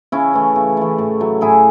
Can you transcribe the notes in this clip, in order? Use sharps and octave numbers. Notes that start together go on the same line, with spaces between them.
C#3 C#4 E4
E3 A3
C#3
E3 A3
A2
F#3 A3
A2 E4 G#4